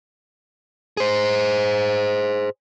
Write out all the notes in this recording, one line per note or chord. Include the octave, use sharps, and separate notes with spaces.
G#4 C5